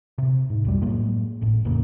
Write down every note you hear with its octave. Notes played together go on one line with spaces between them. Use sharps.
C3
G#2
C2 F#2 G3
A2 F#3 G#3 A#3
G#1 A2
A1 E2 C#3 A#3